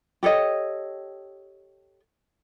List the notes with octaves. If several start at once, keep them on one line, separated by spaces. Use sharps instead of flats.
G4 A4 C#5 D#5